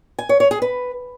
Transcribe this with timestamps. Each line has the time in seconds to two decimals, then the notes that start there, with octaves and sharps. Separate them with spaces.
0.19 G#5
0.29 C#5
0.40 C#5
0.51 G#4
0.62 B4